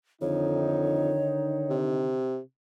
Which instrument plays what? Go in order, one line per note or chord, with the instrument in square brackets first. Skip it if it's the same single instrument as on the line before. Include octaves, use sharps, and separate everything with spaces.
[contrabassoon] F2 [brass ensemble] D3 D#3 D#4 [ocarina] C#5
[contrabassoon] C3